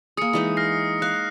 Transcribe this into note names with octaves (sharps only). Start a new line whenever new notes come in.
A#3 G#4 D#6 C#7
E3 G#3 D#4
F6 A#6 C7
F5 F#6